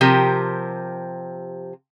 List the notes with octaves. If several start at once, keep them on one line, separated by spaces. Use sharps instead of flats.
C3 F3 G4 A#4